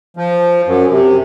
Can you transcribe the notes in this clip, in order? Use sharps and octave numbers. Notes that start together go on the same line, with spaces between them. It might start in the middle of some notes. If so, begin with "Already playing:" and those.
F3
F#2
C3